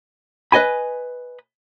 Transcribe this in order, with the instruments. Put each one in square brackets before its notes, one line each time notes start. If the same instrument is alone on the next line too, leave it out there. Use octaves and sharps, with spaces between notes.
[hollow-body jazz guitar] B4 D#5 G#5 B5